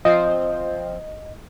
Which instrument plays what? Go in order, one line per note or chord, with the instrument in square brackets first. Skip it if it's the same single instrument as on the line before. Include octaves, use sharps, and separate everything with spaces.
[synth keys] F3 C4 C5 [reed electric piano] D#5